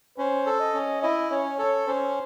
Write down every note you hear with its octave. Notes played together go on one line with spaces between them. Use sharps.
C#4 C5
A4
D#5
C#4
E4 D#5
C#4 C#5
A4 C#5
C#4 C5